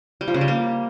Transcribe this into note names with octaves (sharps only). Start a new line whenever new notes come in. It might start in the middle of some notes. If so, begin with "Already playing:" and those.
G3
F3
C#3
G3
A#3